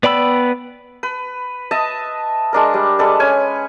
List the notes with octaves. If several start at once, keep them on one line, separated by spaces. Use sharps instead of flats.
B3 D5 G5 B5 E6
B4
D#5 E5 A5 D#6
G#3 D4 A#4
G3
G#3 A4 B4 D5
C#4 G#5